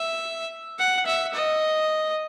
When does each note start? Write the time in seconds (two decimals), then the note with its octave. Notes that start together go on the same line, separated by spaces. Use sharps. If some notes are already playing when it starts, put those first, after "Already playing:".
Already playing: E5
0.79 F#5
1.06 E5
1.34 D#5